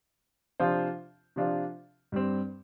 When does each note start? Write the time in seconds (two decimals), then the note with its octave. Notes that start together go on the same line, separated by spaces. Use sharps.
0.60 C3 F3 D4 F4 C5
1.36 C3 F3 D4 F4 C5
2.12 G2 G3 C4